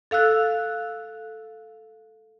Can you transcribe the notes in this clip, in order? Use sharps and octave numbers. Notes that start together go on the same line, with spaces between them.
A4 F5 E6 F#6